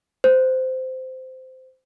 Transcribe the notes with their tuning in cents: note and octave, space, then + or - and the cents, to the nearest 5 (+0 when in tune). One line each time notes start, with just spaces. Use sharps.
C5 -15